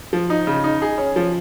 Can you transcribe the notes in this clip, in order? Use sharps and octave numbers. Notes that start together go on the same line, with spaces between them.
F3
D#4
C#3
D#4
G#4
C#4
F3